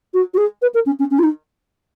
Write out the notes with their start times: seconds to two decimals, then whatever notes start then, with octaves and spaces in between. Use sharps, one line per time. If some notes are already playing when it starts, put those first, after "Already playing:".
0.14 F#4
0.34 F#4
0.38 G#4
0.62 B4
0.74 A#4
0.86 C#4
0.99 C#4
1.11 C#4
1.19 F4
1.23 D#4